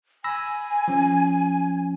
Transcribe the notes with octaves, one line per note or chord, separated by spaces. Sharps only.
G#5 B5 E6 A#6
F3 C#4